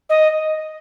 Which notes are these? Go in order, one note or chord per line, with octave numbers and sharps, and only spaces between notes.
D#5